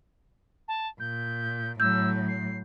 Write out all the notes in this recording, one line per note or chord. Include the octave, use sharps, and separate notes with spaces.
A5
A#2 G6
A2 F#3 E6 G6
C7